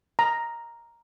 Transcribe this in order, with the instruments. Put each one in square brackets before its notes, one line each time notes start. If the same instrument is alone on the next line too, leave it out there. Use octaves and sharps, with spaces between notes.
[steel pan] A#5